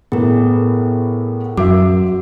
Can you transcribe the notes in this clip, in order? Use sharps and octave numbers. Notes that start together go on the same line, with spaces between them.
A2 B3 G#4 A#4
F#2 F#4 E5 D6